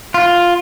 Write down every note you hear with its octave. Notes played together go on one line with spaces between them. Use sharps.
F4